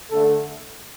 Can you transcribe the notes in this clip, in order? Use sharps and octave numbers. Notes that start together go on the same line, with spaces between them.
D3 A3 A4